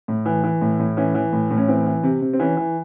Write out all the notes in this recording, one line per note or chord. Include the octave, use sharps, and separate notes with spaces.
A2
E3
E3
A2
A2
E3 C#4
E3
A2
A2
C#4
E3 C4
E3
C3
C3
C4
E3 C#4
E3